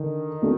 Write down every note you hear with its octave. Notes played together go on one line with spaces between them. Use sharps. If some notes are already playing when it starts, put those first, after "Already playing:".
Already playing: D3 D#3
A3 D4 F#4